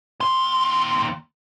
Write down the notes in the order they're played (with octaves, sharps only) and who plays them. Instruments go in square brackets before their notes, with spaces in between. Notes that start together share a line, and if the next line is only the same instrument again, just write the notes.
[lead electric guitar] D#2 C6